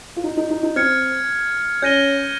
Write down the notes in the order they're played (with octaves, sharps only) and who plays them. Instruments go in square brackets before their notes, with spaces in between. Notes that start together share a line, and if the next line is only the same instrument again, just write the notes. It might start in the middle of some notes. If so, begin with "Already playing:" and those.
[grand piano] F4
D#4
D#4
D#4
D#4
[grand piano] C4 [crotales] F6 G#6 C#7
[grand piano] C#4 [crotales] G6 A#6 D#7 G7